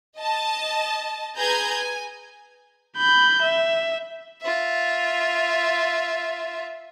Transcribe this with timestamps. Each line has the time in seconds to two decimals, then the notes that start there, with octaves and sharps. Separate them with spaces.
0.18 D#5 A5
1.37 G#4 B4 G#5 A#5 G6 G#6
1.78 G#5
2.97 B5 G6
3.42 E5
4.42 F4 E5